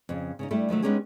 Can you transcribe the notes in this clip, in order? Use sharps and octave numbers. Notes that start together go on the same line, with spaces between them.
F2 C#3
C#3 C#4 D#4
G3 A3 D4 E4 A4
D#3 F3 F#3 A3
G#3 B3 C#4 D#4 G4 G#4